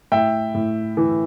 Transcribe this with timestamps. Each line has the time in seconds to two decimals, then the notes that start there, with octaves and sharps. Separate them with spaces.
0.12 A2 E5 G5
0.54 A2
0.97 E3